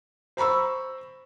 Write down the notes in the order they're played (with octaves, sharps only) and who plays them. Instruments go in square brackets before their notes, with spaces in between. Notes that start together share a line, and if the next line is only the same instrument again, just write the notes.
[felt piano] C5 A#5 B5 C#6 E6